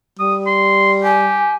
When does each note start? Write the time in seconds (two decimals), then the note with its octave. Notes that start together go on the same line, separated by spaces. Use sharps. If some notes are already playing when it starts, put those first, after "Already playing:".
0.19 G3 D#6
0.46 C6
1.03 G4 G#5